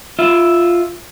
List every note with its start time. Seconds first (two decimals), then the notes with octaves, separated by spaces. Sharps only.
0.19 F4 E5